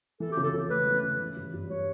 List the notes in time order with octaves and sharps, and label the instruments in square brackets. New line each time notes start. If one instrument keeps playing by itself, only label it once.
[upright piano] E3 [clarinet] A4
[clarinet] G4
[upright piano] C#3
[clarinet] A4
[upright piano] C#3
[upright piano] A3 [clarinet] B4
[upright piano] E3
C#3
E3
G2
G2
[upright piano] G3 [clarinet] C#5